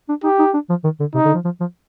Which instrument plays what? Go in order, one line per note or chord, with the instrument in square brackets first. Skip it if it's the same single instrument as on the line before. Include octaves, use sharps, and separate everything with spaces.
[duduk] D4
[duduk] D#4 [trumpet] G4
[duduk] D#4
D4
F3
D#3
D3
[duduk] C3 [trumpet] D#4
[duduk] D3
F3
F3
F3